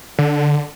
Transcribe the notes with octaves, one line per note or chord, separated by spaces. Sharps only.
D3